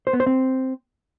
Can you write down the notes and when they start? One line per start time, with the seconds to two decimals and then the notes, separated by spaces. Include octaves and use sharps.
0.07 C5
0.13 B3
0.20 C5
0.26 C4